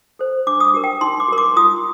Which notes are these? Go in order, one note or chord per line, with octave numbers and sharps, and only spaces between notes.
A4 C5
D4 D6
D#6
D6
G4 A#4
G5
D#4 C6
D6
G4 A#4 C6
D6
F4 D#6